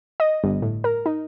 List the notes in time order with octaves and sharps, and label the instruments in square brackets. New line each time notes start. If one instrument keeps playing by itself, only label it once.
[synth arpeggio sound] D#5
G1
A2
A#4
D#4